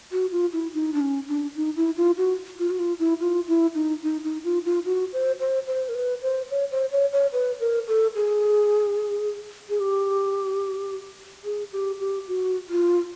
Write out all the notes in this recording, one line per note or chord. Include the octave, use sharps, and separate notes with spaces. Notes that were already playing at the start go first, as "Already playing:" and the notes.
F#4
F4
E4
D#4
D4
C#4
D4
D#4
E4
F4
F#4
F4
F#4
F4
E4
F4
E4
D#4
D#4
D#4
F4
F4
F#4
C5
C5
C5
A#4
B4
C5
C#5
C5
C#5
C#5
B4
A#4
A4
G#4
G#4
G4
G#4
G4
G4
F#4
F4